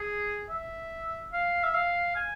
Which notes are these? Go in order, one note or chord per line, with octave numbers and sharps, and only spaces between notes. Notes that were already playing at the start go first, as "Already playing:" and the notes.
Already playing: G#4
E5
F5
E5
F5
G#5